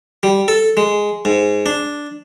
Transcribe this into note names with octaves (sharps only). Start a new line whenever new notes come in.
G3
A4
G#3
G#2
D4